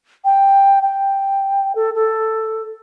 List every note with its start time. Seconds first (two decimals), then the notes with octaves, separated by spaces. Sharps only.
0.25 G5
0.82 G5
1.75 A4
1.95 A4